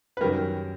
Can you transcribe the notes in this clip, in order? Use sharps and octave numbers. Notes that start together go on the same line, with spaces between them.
B4
F#2 D#3 G3 A#4